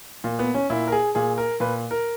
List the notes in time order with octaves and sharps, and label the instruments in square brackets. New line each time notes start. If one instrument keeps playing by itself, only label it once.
[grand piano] A#2
B3
C#4
A#2 E4
A#4
G#4
A#2 G#4
A#4
A#2 B4
A#4